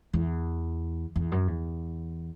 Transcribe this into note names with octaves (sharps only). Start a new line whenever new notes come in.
E2
E2
F#2
E2